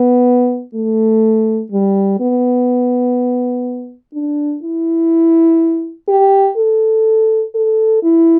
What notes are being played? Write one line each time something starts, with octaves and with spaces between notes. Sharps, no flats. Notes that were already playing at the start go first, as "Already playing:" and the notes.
Already playing: B3
A3
G3
B3
D4
E4
G4
A4
A4
E4